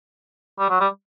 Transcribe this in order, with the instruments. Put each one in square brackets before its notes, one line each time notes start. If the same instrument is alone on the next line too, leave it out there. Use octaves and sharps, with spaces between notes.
[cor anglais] G3
F#3
G3